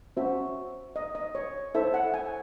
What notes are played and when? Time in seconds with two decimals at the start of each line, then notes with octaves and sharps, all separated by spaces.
0.17 C#4 F#4 C5 E5
0.96 D#5
1.15 D#5
1.35 C#5
1.75 E4 A4 C5 E5
1.94 F#5
2.14 G#5